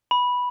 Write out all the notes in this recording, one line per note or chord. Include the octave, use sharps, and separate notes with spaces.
B5